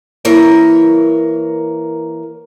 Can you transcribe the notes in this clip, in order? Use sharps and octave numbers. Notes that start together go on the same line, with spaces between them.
E3 A#3 A#4 C#5